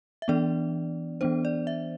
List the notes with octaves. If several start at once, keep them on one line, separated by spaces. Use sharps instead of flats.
E5
E3 B3 D4 D5
E3 B3 D4 C5
D5
E5